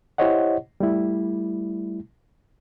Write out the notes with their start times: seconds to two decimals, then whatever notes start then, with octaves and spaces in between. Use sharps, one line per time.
0.18 E4 G4 C5 C#5 D#5 F#5
0.80 G3 A3 E4